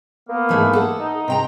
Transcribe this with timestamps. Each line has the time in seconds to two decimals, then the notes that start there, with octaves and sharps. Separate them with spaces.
0.29 A#3 B3
0.49 G#2 E3 A3
0.73 A4 F#5
1.00 D#4
1.28 C3 G5 A#5